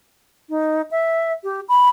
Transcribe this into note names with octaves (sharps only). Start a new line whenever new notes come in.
D#4
E5
G4
B5